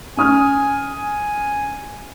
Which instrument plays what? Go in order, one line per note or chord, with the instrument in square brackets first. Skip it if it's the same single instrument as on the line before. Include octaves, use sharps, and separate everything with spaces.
[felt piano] C#4 D#6 F6 [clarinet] G#5
[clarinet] G#5